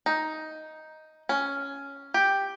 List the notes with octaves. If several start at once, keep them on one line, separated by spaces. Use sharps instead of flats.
D#4
C#4
G4